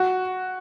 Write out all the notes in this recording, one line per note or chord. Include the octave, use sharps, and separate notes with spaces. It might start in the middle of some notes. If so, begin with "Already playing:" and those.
Already playing: F#4